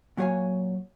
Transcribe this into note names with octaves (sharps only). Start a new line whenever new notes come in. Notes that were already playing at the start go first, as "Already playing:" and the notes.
A#2 F#3 G4 C#5 F5 G#5